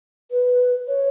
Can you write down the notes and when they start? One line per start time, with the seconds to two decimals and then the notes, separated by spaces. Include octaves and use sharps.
0.31 B4
0.88 C#5